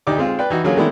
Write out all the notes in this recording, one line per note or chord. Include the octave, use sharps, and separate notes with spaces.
D2 D#4 G4 D5 D6
G#3 C4 F4
B4 D5 G5
E3 D#4 F#4
D3 F#3 A#3 C#4 F4 G#4
D#3 G#3 A3 B3 D4 E4